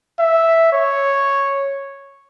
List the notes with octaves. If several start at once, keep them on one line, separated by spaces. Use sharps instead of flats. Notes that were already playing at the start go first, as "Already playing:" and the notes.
E5
C#5